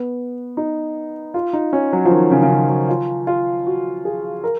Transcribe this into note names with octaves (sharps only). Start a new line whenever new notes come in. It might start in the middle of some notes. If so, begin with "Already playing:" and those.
Already playing: B3
D#4
F4
D#4
C#4
F#3
F3
D#3
C#3
C#3
D#3
F#3
F4
F4
F#4
G#4
A#4